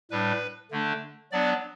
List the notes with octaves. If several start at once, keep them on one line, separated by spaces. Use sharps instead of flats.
A2 G3 D4 B4
D3 A3 D4
F#3 B3 D4 D5